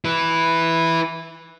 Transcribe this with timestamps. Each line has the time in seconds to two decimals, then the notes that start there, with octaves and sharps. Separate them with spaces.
0.05 E4 B4